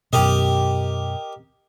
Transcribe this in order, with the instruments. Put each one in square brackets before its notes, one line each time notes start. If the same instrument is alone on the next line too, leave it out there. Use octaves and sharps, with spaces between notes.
[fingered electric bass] F#2 B2 [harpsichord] G4 A#4 D#5